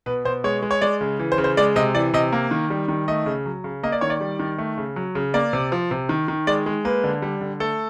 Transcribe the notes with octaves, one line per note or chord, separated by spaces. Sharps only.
B2 B4
B2 C5
G#3 C#5
G#3
C#5
G#3 D5
C#3
E3
C5
C#3
C5
G#3 D5
C3 D#5
E3 D5
C3 D#5
A#3
D#3
G3
D#3
A3 D#5
C#3
F#3
C#3
A#3 D#5
D5
D#3 C#5
D5
G3
D#3
A3
C#3
F#3
C#3
A#3 D5
C3
F3
C3
D#3
D#3
G#3 D5
G#3
A#3 B4
D3
G3
D3
A3 A4